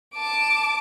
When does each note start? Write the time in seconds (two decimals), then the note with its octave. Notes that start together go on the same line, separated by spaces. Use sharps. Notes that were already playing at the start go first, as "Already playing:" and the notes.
0.14 A5 D6